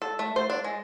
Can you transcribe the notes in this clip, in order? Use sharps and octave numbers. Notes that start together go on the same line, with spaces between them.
A4
A3
C5
D4
G#3